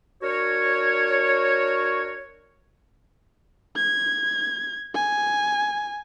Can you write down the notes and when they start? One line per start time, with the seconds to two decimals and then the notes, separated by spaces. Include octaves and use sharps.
0.23 D4 F#4 A#4 C#5
3.76 G#6
4.95 G#5